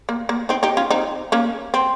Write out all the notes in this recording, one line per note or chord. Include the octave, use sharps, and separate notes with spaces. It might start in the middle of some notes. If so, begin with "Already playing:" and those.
A#3
A#3
C4 D#4
D#4 G4
C#4 F4
C4 D#4
A#3 C#4
C4